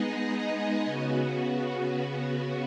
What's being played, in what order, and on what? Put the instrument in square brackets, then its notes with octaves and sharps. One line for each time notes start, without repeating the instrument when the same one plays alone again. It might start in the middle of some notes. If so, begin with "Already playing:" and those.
Already playing: [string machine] G#3 B3 D#4 G#4 D#5
C#3 B3 F#4